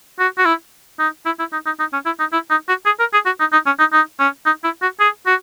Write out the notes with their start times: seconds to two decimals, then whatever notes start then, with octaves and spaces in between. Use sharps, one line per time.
0.19 F#4
0.38 F#4
0.45 E4
0.99 D#4
1.26 E4
1.39 E4
1.52 D#4
1.66 D#4
1.79 D#4
1.93 C#4
2.06 E4
2.20 D#4
2.33 E4
2.50 D#4
2.68 F#4
2.86 G#4
2.99 A#4
3.13 G#4
3.26 F#4
3.40 D#4
3.53 D#4
3.66 C#4
3.79 D#4
3.93 D#4
4.19 C#4
4.46 D#4
4.64 E4
4.82 F#4
5.00 G#4
5.26 F#4